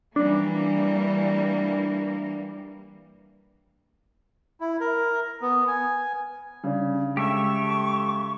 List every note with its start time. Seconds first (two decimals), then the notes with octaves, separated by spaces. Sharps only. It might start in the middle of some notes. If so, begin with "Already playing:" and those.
0.16 E3 G3 A#3 D4
4.60 E4
4.81 A#4
5.42 B3
5.68 G#5
6.64 C#3 G3 D4 D5
7.17 G#3 G4 A4 E5 C#6